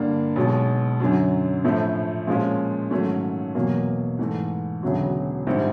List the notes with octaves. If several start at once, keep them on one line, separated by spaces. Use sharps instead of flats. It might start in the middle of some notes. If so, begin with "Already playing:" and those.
Already playing: G2 D3 G3 A#3 D4
B1 B2 G#3
F#2 D3 F#3
A#1 A2 F3 A3
A#2 F3 G#3 C#4 F4
G#2 D#3 F#3 A3 C#4
E2 B2 F#3 A#3
G#2 E3 A3
E1 D2 C#3 F#3
A#1 G#2 D#3 G3 C4